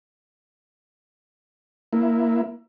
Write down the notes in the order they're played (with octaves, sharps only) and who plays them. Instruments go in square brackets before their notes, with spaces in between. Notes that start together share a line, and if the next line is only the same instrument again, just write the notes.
[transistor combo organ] A#3 E4